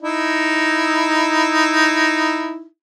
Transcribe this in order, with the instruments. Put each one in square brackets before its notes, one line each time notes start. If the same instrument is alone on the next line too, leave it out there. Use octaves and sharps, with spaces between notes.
[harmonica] D#4 E4